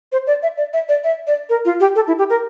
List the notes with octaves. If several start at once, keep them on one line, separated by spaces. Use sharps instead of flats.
C5
D5
E5
D5
E5
D5
E5
D5
A#4
F4
G4
A4
E4
G4
A#4